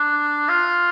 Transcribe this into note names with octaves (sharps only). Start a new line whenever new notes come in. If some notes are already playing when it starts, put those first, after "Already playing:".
Already playing: D4
F4